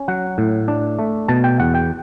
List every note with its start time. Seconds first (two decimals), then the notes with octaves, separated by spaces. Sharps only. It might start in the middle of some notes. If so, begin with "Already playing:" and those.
Already playing: C#4
0.08 F#3 F#5
0.38 A2
0.68 D4
0.99 A3
1.28 B2 A5
1.44 G5
1.60 E2 F#5
1.75 G5